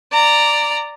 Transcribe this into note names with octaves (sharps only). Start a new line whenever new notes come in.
D5 A#5